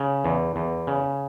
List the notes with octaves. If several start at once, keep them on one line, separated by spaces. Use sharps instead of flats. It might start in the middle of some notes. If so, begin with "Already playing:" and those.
Already playing: C#3
E2
E2
C#3